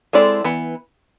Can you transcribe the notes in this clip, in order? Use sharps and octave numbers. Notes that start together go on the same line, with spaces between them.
G#3 C4 E4 A4 D5
E3 B3